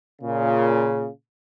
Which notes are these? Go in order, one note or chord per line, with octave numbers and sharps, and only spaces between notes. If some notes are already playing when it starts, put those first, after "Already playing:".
A#2 C#3